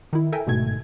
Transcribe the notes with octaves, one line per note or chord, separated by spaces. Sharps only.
D#3 E4
A4 A#4 E5 G5 G#5
G1 G#2 B2 A3 G#6